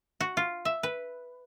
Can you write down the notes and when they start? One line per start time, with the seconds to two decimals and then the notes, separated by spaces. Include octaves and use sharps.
0.21 F#4
0.37 F4
0.65 E5
0.83 B4